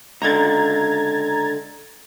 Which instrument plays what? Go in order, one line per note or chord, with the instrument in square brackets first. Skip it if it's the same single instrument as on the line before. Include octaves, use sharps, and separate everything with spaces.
[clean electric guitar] C#2 D3 [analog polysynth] A#5 G#6 A6